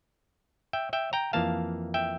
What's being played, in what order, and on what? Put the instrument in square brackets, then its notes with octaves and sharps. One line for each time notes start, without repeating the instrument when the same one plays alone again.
[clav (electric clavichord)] E5 G5
E5 G5
G5 A#5
F2 E3 A#3 F5 A5
E5 G5